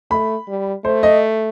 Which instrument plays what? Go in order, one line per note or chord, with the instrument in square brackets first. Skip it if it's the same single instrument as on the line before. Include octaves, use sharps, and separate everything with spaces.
[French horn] A3 [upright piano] B5
[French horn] G3
[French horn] A3 [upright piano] C5
[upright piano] D#5